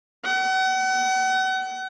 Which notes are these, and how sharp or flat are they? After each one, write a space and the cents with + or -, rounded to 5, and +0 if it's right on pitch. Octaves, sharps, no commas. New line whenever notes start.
F#5 +35